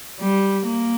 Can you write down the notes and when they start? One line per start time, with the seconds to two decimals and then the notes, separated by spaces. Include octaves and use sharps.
0.20 G3
0.66 A#3